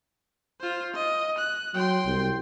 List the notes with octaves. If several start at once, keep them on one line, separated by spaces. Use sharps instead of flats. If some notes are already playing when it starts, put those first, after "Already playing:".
F4 C5
D#5
F#6
F#3 G5 C6
C2